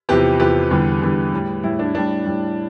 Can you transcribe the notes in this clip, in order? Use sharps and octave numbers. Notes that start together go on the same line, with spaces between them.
E2 C3 F3 G4 B4
E2 C3 F3 G4 B4
E2 D3 G3
E2 D3 G3
A2 G3
A2 G3 E4
D4
A2 G3 D4
A2 G3